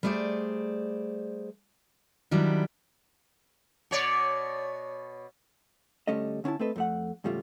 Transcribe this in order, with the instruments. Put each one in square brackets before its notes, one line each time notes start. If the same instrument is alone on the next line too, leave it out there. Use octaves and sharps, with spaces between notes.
[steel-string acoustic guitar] G3 A3 G#4 C5 D5
D#3 F#3 G3 C4 D4 E4
[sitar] B2 C#5 D5
[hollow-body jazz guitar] D2 G3 A3 C#4 A4 D#5
D3 C#4 D4 E4 A5
A3 C4 A4 B4 D#5
F2 A3 F#5
E2 G#2 C#3 G3 A3 F4